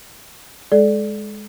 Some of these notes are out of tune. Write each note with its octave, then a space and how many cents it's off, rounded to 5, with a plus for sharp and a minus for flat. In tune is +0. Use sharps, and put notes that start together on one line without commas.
G#3 +0 A4 -30 D5 +0